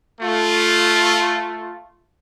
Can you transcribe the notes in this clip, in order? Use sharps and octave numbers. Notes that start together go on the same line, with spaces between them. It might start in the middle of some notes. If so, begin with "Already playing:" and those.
A3 F4